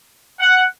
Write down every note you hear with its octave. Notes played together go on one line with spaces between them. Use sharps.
F#5